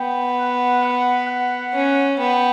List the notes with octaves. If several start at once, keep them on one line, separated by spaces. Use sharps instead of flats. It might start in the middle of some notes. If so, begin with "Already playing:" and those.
Already playing: B3 G5
F#5
F#5
F#5
C#4
B3 G5